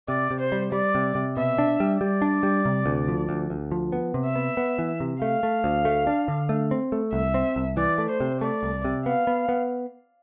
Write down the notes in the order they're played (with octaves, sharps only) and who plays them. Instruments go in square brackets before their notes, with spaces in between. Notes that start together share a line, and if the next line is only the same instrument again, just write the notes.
[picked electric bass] C3 [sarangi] D5
[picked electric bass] C3
[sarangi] C5
[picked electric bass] G3
[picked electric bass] G3 [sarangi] D5
[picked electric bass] C3
C3
[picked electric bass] B2 [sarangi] E5
[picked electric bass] D4
G3
[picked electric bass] G3 [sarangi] D5
[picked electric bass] D4
G3
C3
D2
F3
D2
D2
F3
B3
C3
[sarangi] E5
[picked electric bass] B3
B3
E3
C3
[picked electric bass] A3 [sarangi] F5
[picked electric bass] A3
D2
A3
D4
D3
A3
C4
A3
[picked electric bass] C2 [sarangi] E5
[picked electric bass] C4
C2
[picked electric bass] E3 [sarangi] D5
[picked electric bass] A3
[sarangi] C5
[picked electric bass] C3
[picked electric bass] A3 [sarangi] D5
[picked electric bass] C2
C3
[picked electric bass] B3 [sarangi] F5
[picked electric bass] B3
B3